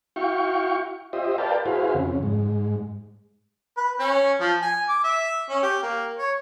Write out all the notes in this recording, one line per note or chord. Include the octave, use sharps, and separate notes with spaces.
E4 F#4 F5 G5 C#6
F4 G4 C5 D#5 E5
A#4 B4 D5 F5 G5 A5
E4 F#4 G#4 B4 C5 F5
F2 C#3
G#2
B4
C#4
F3
G#5
D6
E5
C#4
G4
A#3
C#5